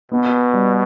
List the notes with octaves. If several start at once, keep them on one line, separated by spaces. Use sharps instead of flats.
B2 B3
G3